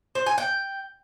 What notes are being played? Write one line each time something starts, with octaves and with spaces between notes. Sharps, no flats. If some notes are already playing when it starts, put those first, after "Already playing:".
C5
G#5
G5